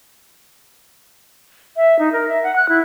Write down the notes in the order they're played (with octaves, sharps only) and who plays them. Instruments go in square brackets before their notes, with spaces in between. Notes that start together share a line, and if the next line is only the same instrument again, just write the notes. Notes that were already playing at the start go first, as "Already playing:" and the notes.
[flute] E5
D#4
A#4
E5
F#5
F#6
E4